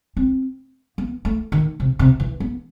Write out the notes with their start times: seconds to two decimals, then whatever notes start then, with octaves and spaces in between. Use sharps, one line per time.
0.17 C4
0.98 B3
1.25 A3
1.52 D#3
1.80 C3
1.99 C3
2.20 E3
2.40 B3